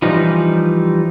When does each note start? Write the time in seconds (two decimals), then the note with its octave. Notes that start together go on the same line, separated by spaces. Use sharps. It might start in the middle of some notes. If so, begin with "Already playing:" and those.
0.02 E3 F3 G3 D#4